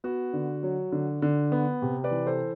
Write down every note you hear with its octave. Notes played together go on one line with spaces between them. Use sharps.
B3 F#4
D3
F#3
D3
D3
B3
C3
B4 D5
E3
A4 C5